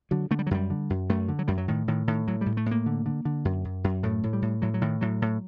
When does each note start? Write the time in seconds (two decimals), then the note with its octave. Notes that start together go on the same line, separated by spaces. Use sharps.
0.11 D3 F#3
0.31 D3 A3
0.39 G3
0.47 F#3
0.51 F#2 G3
0.70 D3
0.90 F#2
1.09 F#2 A3
1.28 D3
1.39 F#3
1.48 F#2 G3
1.58 F#3
1.68 A2 D#3
1.88 A2 D#3
2.08 A2 D#3
2.28 A2 F#3
2.41 A2 G3
2.57 A3
2.66 A2
2.71 A#3
2.86 D3
3.06 D3
3.25 D3
3.45 F#2
3.65 F#2
3.84 F#2
4.03 A2 A3
4.24 A2
4.33 G3
4.42 A2
4.62 A2 F#3
4.74 F#3
4.81 A2 D#3
5.01 A2 F#3
5.22 A2